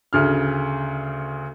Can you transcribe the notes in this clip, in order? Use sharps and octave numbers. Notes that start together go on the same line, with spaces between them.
D2 C#3 F6